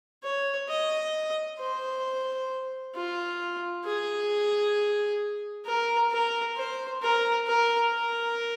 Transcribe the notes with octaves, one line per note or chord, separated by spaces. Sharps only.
C#5
D#5
C5
F4
G#4
A#4
A#4
C5
A#4
A#4
A#4